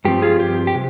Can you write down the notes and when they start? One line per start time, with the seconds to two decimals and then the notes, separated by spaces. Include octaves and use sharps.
0.05 G2 F3 C4 G4
0.22 F4 G#4
0.40 G4
0.67 G4
0.75 C3